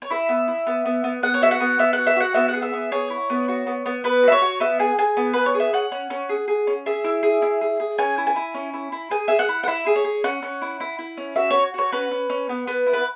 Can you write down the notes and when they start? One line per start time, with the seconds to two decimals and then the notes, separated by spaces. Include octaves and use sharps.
0.02 C#5
0.10 E4 E5
0.29 B3
0.48 E4
0.67 B3
0.86 B3
1.04 B3
1.23 B3 F#5
1.34 C#5
1.42 F#4 E5
1.51 F#5
1.60 B3
1.79 B3 E5
1.93 F#5
1.98 F#4
2.07 E5
2.16 F#4 F#5
2.34 B3 E5
2.48 F#5
2.54 G#4
2.62 E5
2.73 B3
2.92 G#4 C#5
3.10 E4
3.30 B3
3.48 F#4
3.67 B3
3.86 B3
4.04 B3 B4
4.23 F#4 E5
4.32 C#5
4.42 F#4
4.60 B3 E5
4.79 G#4 G#5
4.98 G#4 G#5
5.17 B3
5.33 B3 B4
5.46 C#5
5.55 G#4
5.60 E5
5.73 C#4 F#5
5.92 C#4
6.10 C#4
6.29 G#4
6.48 G#4
6.67 C#4
6.86 G#4 E5
7.04 E4
7.23 G#4
7.42 E4
7.61 G#4
7.80 G#4
7.98 C#4 G#5
8.18 E4
8.27 G#5
8.36 E4
8.54 C#4
8.73 E4
8.92 E4
9.11 G#4 G#5
9.28 G#4 E5
9.39 F#5
9.49 E4
9.64 F#5
9.68 E4 E5
9.86 G#4
9.96 C#5
10.04 G#4
10.24 C#4 F#5
10.43 C#4
10.62 E4
10.80 E4
10.99 E4
11.17 C#4
11.36 F#4 E5
11.50 F#4 C#5
11.74 F#4 C#5
11.92 C#4 B4
12.11 C#4
12.30 C#4
12.49 B3
12.67 B3
12.86 E4
12.93 B4